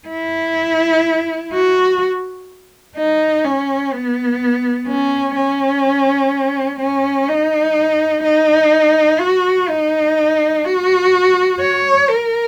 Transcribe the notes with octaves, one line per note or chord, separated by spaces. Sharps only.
E4
F#4
D#4
C#4
B3
C#4
C#4
C#4
D#4
D#4
F#4
D#4
F#4
C#5
A#4